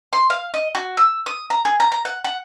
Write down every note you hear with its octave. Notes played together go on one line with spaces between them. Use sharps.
C6
F5
D#5
F#4
E6
D#6
A#5
G#4
A#5
A#5
F#5
F#5